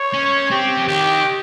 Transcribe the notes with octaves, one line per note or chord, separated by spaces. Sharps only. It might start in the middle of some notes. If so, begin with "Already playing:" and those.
Already playing: C#5
C#4
C4 G4
F3
D#3 G4